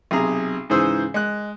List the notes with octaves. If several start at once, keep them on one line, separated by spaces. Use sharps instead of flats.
B1 C3 G#4 A#5
G#2 C#3 E3 G#4 C5 E6
G#3 F#6